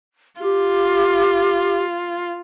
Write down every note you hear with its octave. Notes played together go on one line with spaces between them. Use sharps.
F4 G4